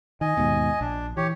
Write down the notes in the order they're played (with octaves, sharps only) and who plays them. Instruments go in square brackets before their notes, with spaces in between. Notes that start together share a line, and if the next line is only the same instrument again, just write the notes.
[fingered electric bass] D#3 [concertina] D#5 G#5
[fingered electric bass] D#2 G#2 B2
[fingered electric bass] A#1 [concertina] D4
[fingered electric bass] E3 [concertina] G4 C#5